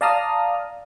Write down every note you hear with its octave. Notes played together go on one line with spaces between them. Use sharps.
D5 F5 A5 A#5 D#6 F6